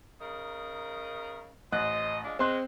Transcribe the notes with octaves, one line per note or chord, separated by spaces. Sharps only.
C#3 D#4 A#4
A1 C5 D#5 F#6
F3 G#3 D4
G#3 C4 C6 F#6